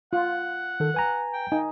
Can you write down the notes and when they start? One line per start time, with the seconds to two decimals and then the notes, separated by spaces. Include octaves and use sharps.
0.13 F4 F#5
0.80 D#3 A4
0.94 B4 G#5 A#5
1.33 G5
1.52 D#4 G#5